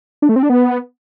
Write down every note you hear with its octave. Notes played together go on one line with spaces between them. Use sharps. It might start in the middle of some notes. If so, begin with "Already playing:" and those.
D4
A3
C4
D4
B3